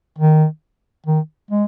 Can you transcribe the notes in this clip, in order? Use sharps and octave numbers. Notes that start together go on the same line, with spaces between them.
D#3
D#3
G#3